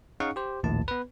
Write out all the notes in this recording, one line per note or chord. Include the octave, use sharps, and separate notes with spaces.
C#4 D#4 G#4 F5 F#5 C#6
G4 C5
A#1 D#2 A2 A5
B3 B4